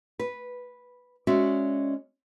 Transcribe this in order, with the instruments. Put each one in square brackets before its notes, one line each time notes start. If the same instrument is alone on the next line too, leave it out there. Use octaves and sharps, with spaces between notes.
[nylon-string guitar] B4
G#3 C#4 F#4 D5 E5